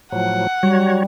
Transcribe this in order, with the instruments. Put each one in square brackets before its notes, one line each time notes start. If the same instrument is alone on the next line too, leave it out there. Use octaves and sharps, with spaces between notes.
[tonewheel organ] A2 F3 F#3 [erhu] F#5
[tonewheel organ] F#3 F#4 C#5 [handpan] G3